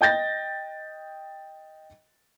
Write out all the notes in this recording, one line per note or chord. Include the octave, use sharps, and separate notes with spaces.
D#5 G5 G6 A6 A#6